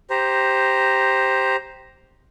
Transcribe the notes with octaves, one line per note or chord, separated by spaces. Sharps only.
G4 C5 A#5